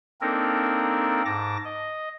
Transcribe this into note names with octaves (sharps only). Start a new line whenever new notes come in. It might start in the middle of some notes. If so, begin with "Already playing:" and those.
A#3 C4 D4 D#4 A4 A#4
G#2 A5 D6 A#6
D#5